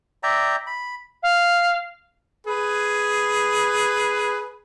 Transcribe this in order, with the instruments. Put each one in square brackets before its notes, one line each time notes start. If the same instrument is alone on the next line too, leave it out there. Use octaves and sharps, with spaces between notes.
[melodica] D5 E5 G5 A#5
B5
[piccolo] F5
[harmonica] G#4 B4